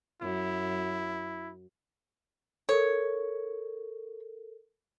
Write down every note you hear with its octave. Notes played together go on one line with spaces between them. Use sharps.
F#2 E4
A4 A#4 C#5